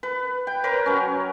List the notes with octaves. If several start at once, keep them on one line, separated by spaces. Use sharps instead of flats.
B4
G5
A#4 B4 C#5
F#3 C#4